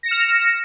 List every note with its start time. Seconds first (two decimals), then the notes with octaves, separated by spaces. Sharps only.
0.03 A#6
0.06 C#7
0.08 E7
0.11 F6